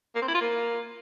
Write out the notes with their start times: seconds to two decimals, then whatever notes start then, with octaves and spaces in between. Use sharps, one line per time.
0.15 A#3
0.22 C4
0.28 E4
0.35 F4
0.41 A#3